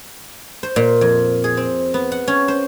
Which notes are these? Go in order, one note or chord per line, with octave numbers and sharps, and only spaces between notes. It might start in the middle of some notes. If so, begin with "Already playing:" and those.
C5
A#2
F2
G#4
C4
B3
F#5
C#4
C5